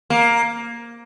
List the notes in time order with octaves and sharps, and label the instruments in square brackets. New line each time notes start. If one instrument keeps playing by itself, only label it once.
[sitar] A#3